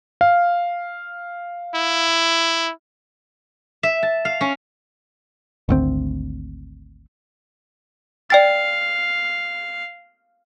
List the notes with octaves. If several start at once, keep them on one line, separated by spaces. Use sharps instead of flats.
F5
E4
E5
A5
F5
C#4
G#1 D2 C4
D5 F5 G5 A6